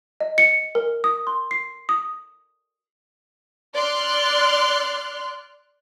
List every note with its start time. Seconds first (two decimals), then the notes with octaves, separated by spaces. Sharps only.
0.20 D#5
0.38 C#7
0.75 A#4
1.04 D#6
1.27 C6
1.51 C7
1.89 D#6
3.74 D5 C6 F6 F#6